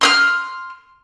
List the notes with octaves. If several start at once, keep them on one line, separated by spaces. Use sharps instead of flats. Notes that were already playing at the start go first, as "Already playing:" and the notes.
C6 D#6 F6